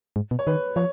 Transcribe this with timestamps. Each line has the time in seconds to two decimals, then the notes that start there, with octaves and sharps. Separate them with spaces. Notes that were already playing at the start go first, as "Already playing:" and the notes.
0.16 G#2
0.31 B2
0.39 C#5
0.47 D#3 B4
0.76 F3 C#5